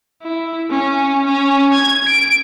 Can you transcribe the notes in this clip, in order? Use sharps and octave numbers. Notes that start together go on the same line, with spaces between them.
E4
C#4
C#4
G#6
D7